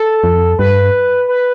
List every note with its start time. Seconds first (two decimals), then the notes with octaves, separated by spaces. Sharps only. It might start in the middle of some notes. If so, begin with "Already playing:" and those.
Already playing: A4
0.24 F2
0.59 G2 B4
1.28 B4